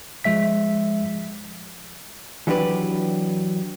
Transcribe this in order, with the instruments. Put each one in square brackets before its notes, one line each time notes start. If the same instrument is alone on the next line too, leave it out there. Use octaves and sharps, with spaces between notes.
[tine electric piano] F3 G#3 E5 B6
[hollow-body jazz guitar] E3 F#3 D4 G4 B4